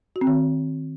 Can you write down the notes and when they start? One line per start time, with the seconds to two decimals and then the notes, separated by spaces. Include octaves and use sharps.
0.16 F#4
0.21 C4
0.27 D#3